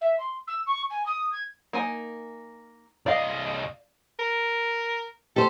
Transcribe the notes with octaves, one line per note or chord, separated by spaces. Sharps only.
E5
C6
E6
C#6
G#5
D#6
G#6
A#3 D#4 G#5
C2 D5 D#5 F5
A#4
G4 A4 C5